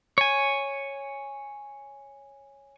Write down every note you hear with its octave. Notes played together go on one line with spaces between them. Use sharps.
C#5 G#5